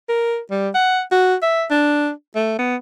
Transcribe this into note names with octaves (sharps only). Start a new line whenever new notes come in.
A#4
G3
F#5
F#4
E5
D4
A3
B3